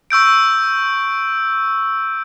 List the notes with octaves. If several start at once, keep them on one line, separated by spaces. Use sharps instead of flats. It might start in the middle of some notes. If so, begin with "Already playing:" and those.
C#6 E6 G6 D7